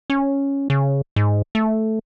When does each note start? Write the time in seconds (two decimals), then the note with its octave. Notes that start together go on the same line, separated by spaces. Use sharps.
0.10 C#4
0.70 C#3
1.16 G#2
1.55 A3